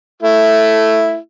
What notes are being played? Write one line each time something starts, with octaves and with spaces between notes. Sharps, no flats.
A3 E4